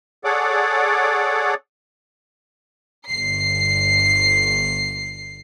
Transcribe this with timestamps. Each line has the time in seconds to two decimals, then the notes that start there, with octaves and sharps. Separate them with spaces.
0.24 G#4 A4 C#5 D5 F#5 D6
3.06 G1 C7